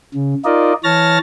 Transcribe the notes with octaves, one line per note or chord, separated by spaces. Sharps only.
C#3
D#4 F4 A#4 D5 D#5
E3 C#5 A5 F6 A6 A#6